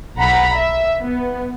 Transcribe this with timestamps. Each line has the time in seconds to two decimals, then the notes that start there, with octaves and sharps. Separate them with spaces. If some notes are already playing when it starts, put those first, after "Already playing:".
0.18 B1 F#5 A#5 B5
0.53 E5
1.00 B3